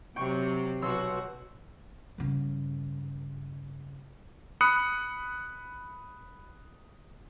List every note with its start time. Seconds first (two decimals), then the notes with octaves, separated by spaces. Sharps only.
0.16 C3 F#3 G5 C#6
0.82 B1 F#4 C6 E6
2.18 G2 C#3
4.61 B5 D#6 F#6 C#7